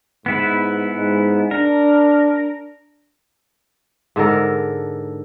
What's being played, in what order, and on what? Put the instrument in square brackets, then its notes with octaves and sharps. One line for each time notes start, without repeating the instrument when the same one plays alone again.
[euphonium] G#2 [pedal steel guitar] B3 E4 B4
[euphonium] G#2
[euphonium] D4 [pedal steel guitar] A#4
[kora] G#2 D3 A4 A#4